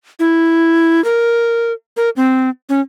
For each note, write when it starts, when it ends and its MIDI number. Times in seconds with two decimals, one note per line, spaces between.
0.19 1.03 64
1.04 1.73 70
1.97 2.10 70
2.16 2.50 60
2.69 2.80 61